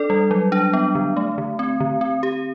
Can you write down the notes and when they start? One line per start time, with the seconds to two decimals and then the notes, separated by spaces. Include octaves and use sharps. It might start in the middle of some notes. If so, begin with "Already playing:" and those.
Already playing: D4 A4 D5
0.10 G3
0.31 F#3
0.52 D4
0.73 B3
0.95 D3
1.17 A3
1.38 D3
1.59 C4
1.80 D3
2.01 C4
2.23 G4